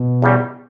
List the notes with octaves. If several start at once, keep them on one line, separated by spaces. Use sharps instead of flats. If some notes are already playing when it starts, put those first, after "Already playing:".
Already playing: B2
E2 C#3 G3